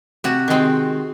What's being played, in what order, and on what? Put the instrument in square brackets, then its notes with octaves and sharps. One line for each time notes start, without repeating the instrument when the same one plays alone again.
[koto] C3 F#4
D#3 G#3 C4